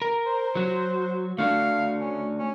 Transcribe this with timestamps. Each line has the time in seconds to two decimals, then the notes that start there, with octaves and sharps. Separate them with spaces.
0.02 A#4
0.26 C5
0.55 F#3 F#4
1.38 A3 D4 F#4 F5
2.00 C#4
2.39 C#4